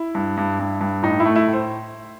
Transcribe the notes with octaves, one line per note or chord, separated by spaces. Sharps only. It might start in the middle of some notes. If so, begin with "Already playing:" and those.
Already playing: E4
G2
G2
G2
G2
A2 D#4
E4
A3
E4
A2
C5